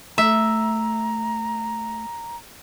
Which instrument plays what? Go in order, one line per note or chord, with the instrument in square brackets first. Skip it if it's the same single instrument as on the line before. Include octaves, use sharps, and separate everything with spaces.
[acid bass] A3 [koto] E5 [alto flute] A#5